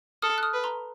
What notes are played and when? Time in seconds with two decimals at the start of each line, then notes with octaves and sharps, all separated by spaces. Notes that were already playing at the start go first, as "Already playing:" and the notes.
0.22 A4 D#6 F6
0.38 F#6
0.43 D#6 F6
0.54 B4
0.64 A#5 C6